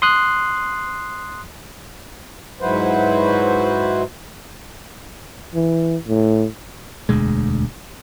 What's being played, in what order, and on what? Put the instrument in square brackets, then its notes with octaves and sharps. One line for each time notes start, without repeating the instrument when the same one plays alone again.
[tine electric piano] C6 D#6 F#6 C7
[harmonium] G#2 F#3 E4 F#4 B4 C5
[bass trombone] E3
A2
[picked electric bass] E1 D2 B2 G#3